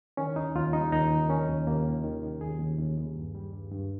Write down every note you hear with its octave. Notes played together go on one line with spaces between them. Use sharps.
D#3 C#4
D#2 D#4
D#2 F4
G3 D#4
D#2 D#4
D#3
D#3 C#4
D#2
D#2 A#3
D#3
D#3
D#3
D#2 G#4
D#2
D#2
D#2
G2
G3
G2
G2